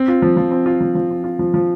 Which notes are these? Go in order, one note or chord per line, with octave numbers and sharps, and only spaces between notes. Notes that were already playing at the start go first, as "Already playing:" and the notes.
Already playing: C4
F4
F3
F3
C4
F4
F3
F3
C4
F4
F3
F3